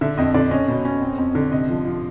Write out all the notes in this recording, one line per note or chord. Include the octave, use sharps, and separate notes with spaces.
D3 E5
F2 D#5
D3 D5
C#4 D#5
B2
C#4
C4
F2
D3
C3 D#5
F3
F3